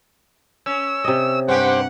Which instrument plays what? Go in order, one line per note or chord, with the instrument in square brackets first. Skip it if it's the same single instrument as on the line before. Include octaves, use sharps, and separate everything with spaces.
[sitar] C#4 [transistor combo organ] E6
[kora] C3 D#5
[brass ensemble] G2 F#5 [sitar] C#4 G4 [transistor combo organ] C5